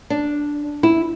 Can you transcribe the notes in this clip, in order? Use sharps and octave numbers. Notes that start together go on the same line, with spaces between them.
D4
E4